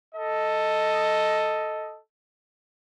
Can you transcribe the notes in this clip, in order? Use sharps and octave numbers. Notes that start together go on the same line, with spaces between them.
A4 D#5